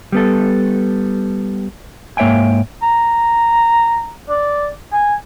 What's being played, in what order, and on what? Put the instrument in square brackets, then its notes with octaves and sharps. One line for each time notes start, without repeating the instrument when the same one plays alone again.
[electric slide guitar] G3 B3 A4
G#2 A#3 C#5 E5 G5 G#5
[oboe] A#5
D5
G#5